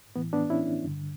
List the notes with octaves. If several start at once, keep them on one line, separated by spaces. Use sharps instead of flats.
A2 E3 B3
B3 D4
C#4 E4
G2 D3